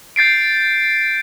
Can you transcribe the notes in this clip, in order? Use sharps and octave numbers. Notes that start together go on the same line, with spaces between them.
G6 A6 C7 D7